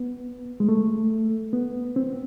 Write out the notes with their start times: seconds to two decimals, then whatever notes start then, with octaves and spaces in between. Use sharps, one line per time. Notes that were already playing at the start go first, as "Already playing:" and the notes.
Already playing: B3
0.60 G#3
0.69 A3
1.53 B3
1.96 C4